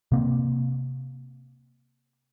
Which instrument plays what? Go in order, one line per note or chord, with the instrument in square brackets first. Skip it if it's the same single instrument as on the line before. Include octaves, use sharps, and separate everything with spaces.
[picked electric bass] C3 A#3 C4